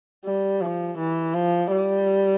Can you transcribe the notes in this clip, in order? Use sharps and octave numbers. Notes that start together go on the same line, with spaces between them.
G3
F3
E3
F3
G3